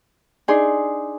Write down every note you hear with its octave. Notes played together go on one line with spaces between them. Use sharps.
D4 D#4 G#4 C6